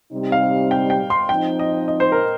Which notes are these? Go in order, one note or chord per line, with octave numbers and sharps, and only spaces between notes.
C3 G3 C4 D#4 G4
F5
G5
G5
C6
F3 C4 D#4 G5
D#5
D#5
C5
A#4